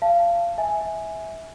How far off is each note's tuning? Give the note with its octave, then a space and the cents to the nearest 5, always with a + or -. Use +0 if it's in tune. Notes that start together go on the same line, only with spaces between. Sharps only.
F5 -25 A5 +0
E5 -20 G#5 +0